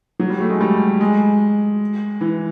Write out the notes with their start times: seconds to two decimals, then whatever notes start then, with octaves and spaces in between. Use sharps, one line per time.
0.19 F#3
0.30 G3
0.40 A3
0.50 G#3
0.61 G3
1.01 G#3
2.21 E3